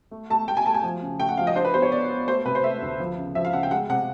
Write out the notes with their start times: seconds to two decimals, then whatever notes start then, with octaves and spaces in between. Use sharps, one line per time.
0.11 A3
0.30 A3 A5
0.48 A3 G5
0.57 G#5
0.66 A3 A5
0.74 G#5
0.83 F3
1.02 C#3
1.20 A3 G5
1.29 F#5
1.37 F3 F5
1.47 D#5
1.55 D4 C5
1.65 B4
1.74 B3 C5
1.82 C#5
1.91 B3 D5
2.10 B3
2.28 A3 C5
2.45 C3 B4
2.55 C5
2.64 A3 E5
2.82 D2
3.00 F3
3.18 C#3
3.35 F3 E5
3.45 F5
3.53 C#3 F#5
3.63 G5
3.71 G#3 F#5
3.90 C3 F#5